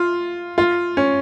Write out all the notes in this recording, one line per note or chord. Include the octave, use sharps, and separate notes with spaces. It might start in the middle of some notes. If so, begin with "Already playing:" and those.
Already playing: F4
F4
C#4